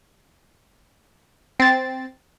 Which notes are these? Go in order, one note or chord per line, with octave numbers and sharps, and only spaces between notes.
C4 A6